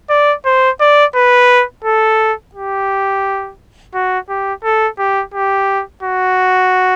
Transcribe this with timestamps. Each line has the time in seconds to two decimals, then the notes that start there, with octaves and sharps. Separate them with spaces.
0.10 D5
0.46 C5
0.81 D5
1.16 B4
1.85 A4
2.55 G4
3.94 F#4
4.29 G4
4.64 A4
4.99 G4
5.34 G4
6.03 F#4